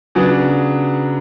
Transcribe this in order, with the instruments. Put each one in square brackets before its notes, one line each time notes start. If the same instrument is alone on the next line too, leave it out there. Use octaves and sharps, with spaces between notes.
[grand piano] C#3 F#3 B3 D4